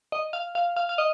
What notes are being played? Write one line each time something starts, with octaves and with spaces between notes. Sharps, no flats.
D#5
F5
F5
F5
F5
D#5